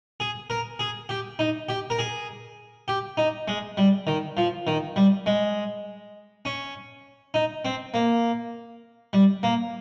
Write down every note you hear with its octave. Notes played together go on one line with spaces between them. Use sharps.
G#4
A#4
G#4
G4
D#4
G4
A#4
G#4
G4
D#4
G#3
G3
D#3
F3
D#3
G3
G#3
C#4
D#4
C4
A#3
G3
A#3